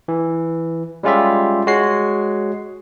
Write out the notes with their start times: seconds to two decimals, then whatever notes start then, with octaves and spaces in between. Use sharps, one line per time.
0.08 E3
1.03 G3 G#3 C#4 F4 G4 E5
1.67 G#3 F#4 C#5 C7